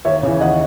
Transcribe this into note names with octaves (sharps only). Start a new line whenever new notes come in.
D#2 C#5 E5
C#3 E3
D#2 D#5 F#5